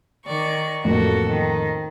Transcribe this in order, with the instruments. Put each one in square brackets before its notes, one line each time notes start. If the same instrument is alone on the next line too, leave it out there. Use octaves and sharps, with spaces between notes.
[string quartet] D#3 D5 C#6
[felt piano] A1 F2 A#3 [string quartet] F#4 A4
[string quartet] D#3